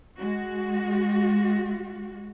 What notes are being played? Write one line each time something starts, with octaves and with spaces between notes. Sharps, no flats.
G#3 F#4